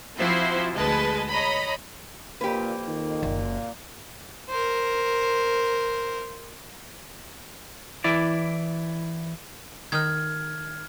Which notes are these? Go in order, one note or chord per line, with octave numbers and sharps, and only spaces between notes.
F3 C4 E4 F#4 C5 E5
D2 G#3 B4 D#5 A5
C#5 D#5 A#5 B5
F2 A#2 A#3 G4 B4
D#3
F#1 A#2 A#3
A#4 C5
E3 E4 D5
D#3 D#4 F6 G#6